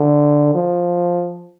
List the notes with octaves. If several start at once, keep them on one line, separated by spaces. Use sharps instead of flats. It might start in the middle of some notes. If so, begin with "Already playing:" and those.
Already playing: D3
F3